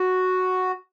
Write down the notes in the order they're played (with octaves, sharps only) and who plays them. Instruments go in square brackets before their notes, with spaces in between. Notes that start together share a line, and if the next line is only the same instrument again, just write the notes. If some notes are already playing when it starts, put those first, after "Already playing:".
Already playing: [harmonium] F#4